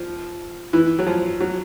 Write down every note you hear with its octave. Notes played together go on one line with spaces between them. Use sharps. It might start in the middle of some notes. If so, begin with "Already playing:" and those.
Already playing: F3
E3
F#3
F3
F#3